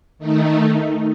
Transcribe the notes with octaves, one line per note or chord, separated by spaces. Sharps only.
D#3 A3 D#4